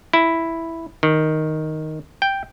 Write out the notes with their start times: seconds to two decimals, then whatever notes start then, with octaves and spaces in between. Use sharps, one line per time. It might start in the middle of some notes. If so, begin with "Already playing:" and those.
0.13 E4
1.03 D#3
2.22 G5